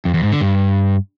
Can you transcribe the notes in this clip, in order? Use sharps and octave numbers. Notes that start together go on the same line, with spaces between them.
F2
E2
G#2
D3
G2